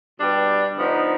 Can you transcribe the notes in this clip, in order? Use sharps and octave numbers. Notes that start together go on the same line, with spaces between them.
B2 G3 D4 G4 B4
D3 F3 B3 D#4